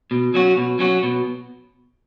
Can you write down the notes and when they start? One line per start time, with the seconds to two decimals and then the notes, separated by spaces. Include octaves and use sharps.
0.11 B2
0.34 F#3 C#4 F#4
0.57 B2
0.79 F#3 C#4 F#4
1.03 B2